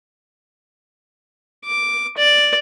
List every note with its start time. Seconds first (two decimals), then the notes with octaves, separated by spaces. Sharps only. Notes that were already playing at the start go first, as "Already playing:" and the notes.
1.65 D6
2.18 D5